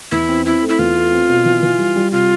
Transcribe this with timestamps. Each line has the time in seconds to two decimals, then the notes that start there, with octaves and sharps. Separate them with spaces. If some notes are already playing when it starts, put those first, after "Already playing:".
0.11 E2 E4
0.29 C4
0.46 C4 E4
0.62 A3
0.69 E4
0.79 E2 F4
0.96 A3
1.12 C4
1.29 B2
1.45 E3
1.63 E3
1.78 G3
1.96 G3
2.12 C3 F4